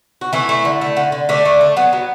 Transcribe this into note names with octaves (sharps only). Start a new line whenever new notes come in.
F#4
E3 A3 E4
A3
D3
A3
D3
D3
D3 A3 D4
A3
A3
F#3 B3
F#3